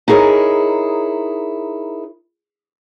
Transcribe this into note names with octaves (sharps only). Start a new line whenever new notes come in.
D#4 E4 G#4 A#4 C#5